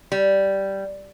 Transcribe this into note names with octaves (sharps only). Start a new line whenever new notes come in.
G3